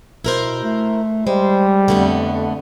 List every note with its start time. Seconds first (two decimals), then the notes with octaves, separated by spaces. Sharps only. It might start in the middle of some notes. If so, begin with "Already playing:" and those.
0.25 B2 E4 A#4 C5
0.63 A3
1.27 G3 G#3 C5
1.88 F2 D3 A3 B3